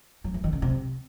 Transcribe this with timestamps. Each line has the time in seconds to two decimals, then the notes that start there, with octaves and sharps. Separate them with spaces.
0.24 F#3
0.34 E3
0.44 D#3
0.53 C#3
0.62 C3